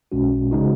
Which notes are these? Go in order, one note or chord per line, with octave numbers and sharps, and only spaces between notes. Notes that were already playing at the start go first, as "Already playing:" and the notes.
B1 B2 G#3 C#4 F#4
C#3 G#3 D#4 F#4